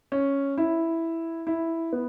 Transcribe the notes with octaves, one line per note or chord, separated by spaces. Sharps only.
C#4
E4
E4
B3